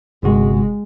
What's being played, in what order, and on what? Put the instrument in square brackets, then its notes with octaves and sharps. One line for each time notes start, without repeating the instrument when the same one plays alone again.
[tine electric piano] G1 C3 F#4 [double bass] G#3